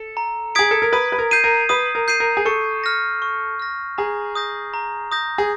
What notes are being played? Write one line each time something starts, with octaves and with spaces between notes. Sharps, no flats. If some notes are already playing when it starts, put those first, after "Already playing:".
Already playing: A4
A#5
G#4 D#6 G#6 B6 D7
A4
A#4
B4 D#6
B4
A#4
G6 C7 D#7
A#4
B4 D#6
A#4
G6 C7 D#7
A#4
G#4
A4 C#6
F6 A#6
C#6
F6 A#6
G#4 A#5
D#6 G6 A#6
A#5
D#6 G6 A#6
G#4